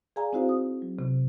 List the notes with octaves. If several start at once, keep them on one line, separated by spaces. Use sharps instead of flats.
G#4 D5 F5 G#5 A#5
C4 D#4 E4 F#4 C5 F5
D#6
F#3
C3